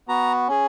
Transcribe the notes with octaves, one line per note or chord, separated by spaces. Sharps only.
B3 F#4 A#5
C#4 G#4